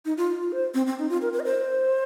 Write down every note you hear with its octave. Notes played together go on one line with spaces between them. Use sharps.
D#4
F4
F4
C5
C4
C4
D#4
F4
A#4
A#4
D#5
C5